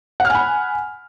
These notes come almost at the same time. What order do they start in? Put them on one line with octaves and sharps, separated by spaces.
F#5 F6 G#5 B5